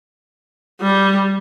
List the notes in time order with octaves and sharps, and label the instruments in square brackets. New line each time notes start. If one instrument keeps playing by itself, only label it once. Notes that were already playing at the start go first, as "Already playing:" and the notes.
[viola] G3